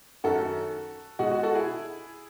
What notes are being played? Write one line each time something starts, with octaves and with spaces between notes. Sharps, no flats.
F#2 D#3 A3 F#4 A4
B2 G#3 D#4 F#4
F#4
F#4 A4
E4 G#4